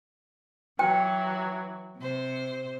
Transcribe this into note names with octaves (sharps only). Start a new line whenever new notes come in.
E3 F#3 G5
C3 C5